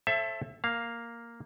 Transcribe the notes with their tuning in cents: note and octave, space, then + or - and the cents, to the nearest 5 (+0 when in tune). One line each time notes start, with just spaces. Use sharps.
A4 +0 C5 +45 E5 +20
A#3 +0 F5 +0